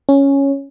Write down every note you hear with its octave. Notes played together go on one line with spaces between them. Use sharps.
C#4